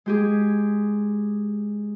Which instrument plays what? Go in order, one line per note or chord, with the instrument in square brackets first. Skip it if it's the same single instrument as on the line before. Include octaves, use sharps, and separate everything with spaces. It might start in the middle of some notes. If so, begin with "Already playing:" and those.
[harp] G#3 G4 G#4